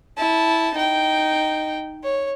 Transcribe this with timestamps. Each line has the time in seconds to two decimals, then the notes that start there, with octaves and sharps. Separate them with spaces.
0.18 E4 A5
0.74 D#4 G5
2.04 C#5